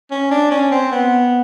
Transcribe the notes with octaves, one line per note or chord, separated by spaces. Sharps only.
C#4
D4
C#4
C4
B3